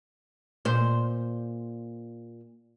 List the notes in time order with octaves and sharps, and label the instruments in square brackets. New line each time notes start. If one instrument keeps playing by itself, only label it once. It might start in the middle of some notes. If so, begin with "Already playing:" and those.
[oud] A#2 C5